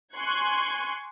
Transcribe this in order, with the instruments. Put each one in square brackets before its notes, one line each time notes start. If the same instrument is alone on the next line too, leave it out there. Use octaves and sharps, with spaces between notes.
[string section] G#5 C6 C#6 F#6 G#6